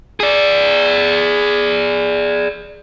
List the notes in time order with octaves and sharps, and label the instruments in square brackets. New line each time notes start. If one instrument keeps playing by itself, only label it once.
[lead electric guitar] G#4 D5